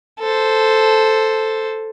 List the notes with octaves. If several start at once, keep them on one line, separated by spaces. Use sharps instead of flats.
A4 C5